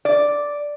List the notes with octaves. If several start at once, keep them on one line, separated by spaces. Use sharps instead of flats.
D5